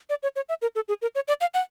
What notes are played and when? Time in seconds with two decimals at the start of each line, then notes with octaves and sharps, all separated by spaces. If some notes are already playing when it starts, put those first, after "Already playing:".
0.10 D5
0.23 C#5
0.36 C#5
0.49 E5
0.62 A#4
0.75 A4
0.88 G#4
1.02 A#4
1.15 C#5
1.28 D5
1.41 F5
1.54 F#5